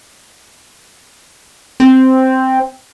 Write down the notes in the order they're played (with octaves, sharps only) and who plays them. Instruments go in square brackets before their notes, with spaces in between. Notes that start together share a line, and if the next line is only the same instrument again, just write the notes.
[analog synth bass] C4